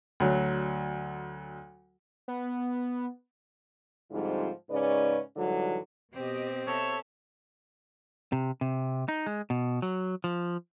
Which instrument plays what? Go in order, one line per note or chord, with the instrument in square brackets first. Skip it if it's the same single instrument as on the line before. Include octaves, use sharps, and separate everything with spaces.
[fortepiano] D2 F#3
[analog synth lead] B3
[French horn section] G#2 D3 F3 G3 C4 F4
G#2 C#3 C#4 B4 D5
G#2 D3 E3 F#3 G3
[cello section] B2 G4 D#5 [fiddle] C4
[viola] A4 E5 [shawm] C#5
[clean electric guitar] C3
C3
D#4
G#3
B2
F#3
F3